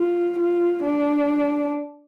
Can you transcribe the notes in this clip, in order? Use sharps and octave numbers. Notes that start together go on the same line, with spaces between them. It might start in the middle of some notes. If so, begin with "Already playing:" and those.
Already playing: F4
F4
D4